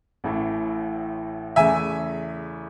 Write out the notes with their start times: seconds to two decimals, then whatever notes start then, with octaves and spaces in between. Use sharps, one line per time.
0.24 A1 A2 E3 A3
1.56 E2 C#3 E3 A3 E5 G#5